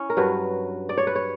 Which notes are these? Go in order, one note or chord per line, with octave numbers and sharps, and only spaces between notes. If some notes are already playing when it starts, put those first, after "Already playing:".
Already playing: C#4 E4
A#4
G2 F#3 B4
D5
C#5
B4
C#5